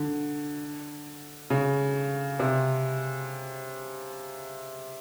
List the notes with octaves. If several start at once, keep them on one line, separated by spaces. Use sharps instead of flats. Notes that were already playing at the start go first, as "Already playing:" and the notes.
Already playing: D3
C#3
C3